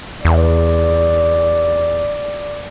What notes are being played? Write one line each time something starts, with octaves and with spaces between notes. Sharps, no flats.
E2 D5